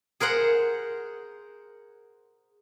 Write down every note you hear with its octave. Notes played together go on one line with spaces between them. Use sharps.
G#4 A#4 C5 F#5